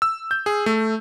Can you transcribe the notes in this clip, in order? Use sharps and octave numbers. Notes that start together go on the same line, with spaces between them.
E6
G6
G#4
A3